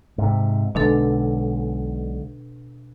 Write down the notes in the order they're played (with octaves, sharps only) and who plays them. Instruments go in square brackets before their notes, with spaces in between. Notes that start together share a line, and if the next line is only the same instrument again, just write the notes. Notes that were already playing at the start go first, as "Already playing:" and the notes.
[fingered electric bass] G#2 C3
[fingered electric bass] B1 D3 G#3 [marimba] B2 D4 A4